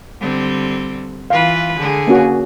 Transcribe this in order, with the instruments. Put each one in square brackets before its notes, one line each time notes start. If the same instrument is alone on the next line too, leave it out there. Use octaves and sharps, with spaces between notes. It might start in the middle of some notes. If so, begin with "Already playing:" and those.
[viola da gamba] D3 G3 C4
[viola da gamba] E3 F4 B4 [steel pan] F5
[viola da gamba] D3 G#4
[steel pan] A#3 C#4 F#4